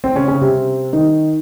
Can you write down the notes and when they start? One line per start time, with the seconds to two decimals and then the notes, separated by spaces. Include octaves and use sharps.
0.04 C4
0.16 C#3 C#4
0.28 C#3 C#4
0.42 C3 C4
0.93 D#3 D#4